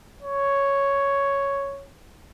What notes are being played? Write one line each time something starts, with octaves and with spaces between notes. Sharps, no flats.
C#5